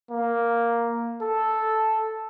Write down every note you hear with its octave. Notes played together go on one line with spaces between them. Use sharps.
A#3
A4